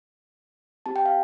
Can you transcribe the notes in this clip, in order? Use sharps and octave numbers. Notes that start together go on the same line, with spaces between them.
C4 G4 A5
G5
F5